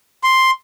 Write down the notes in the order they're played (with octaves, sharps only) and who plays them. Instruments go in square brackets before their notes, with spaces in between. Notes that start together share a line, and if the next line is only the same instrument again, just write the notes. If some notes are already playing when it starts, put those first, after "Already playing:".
[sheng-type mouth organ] C6